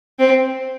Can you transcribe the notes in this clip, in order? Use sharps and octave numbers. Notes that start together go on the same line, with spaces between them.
C4